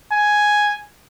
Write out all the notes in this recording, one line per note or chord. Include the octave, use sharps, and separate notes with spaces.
G#5